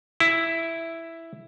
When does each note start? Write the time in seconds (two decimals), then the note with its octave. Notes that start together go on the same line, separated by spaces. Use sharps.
0.20 E4